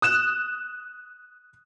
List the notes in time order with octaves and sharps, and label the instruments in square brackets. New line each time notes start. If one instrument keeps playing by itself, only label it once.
[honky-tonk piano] D#6 F#6 E7